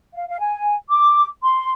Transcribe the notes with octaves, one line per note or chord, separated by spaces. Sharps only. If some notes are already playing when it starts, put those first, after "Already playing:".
F5
F5
G#5
D6
C6